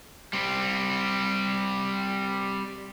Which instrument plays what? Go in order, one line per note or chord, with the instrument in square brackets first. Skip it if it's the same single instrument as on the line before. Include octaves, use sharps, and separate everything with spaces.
[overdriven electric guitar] G3 C4